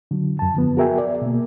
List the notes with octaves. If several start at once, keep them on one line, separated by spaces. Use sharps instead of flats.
D3 F#3
F#2 A5
D3 F3 B3
F#4 G#4 A#4 E5 G5 G#5
D5
B2 A#3